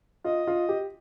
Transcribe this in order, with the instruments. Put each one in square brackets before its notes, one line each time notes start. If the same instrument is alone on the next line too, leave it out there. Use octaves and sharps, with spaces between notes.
[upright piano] F4 [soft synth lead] D#5
[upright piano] F4
G4